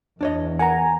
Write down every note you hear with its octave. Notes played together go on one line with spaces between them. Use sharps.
E2 D4 C#5 D#5
A#4 F#5 G#5 A#5